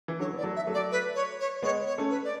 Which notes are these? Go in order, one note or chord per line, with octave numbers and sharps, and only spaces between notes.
E3
D3 F#3 C#5
B3 D5
F#3 A3
E5
F#3 A3
D5
B4
C#5
C#5
G#3 B3 C#5
C#5
A3 C#4
B4
D5